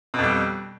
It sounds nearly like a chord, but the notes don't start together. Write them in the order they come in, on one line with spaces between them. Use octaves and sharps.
B2 F2 G3